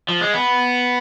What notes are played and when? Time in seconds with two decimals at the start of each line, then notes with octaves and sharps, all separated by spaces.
0.09 F3
0.21 G#3
0.34 B3